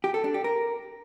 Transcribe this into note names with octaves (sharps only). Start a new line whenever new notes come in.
G4
A4
D4
G4
A#4